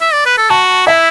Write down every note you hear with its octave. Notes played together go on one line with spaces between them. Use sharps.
E5
D5
B4
A4
F#4 A5
E4 E5